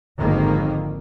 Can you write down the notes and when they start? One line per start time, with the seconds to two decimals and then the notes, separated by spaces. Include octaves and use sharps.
0.19 G#1 F2 D3 D#3 A#3